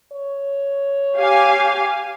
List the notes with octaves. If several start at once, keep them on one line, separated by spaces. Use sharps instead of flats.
C#5
G4 F5 G#5